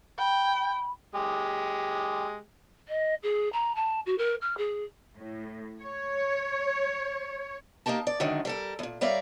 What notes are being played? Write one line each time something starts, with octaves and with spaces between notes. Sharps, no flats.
G5 B5
G#3 G4
D#5
G#4
A#5
A5
F#4
A#4
F6
G#4
A2
C#5
A#3 D#4 G4 A#4 A5
D5
F#2 D3 D#3 F#3 G#3
G3 A4 A#4
E2 A#2
G3 A#4 C#5 D5 E5 F5